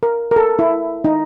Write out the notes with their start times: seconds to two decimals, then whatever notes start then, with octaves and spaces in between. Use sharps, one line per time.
0.03 A#4
0.31 A#4
0.36 A4
0.59 E4
1.04 D#4